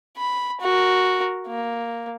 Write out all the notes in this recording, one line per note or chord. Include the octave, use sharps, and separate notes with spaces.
B5
F#4 A#4
A#3